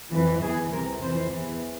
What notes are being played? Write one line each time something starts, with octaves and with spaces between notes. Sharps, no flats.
F2 E3
E2 E3 G#4
C2 C3 E3 A#4
F2 C3 E3 C5
E2 E3